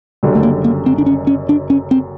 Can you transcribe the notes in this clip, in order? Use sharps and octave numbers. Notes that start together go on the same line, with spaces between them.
F#1 F#2 D3 G3
A3
A#3
A#3
C4
D4
C#4
C#4
D4
C#4
C4